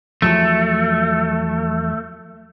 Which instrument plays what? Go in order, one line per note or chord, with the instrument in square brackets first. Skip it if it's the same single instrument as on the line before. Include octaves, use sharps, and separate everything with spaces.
[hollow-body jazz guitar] E2 F3 F#3 [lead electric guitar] A3